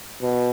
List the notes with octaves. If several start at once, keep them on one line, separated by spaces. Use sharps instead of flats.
B2